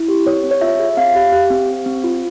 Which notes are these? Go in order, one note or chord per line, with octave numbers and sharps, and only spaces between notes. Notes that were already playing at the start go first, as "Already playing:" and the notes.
Already playing: E4
G4
C4 C#5
C4
C#5
F4 E5
G#4
C4 F5
G4
G4
C4
C4
C4
F4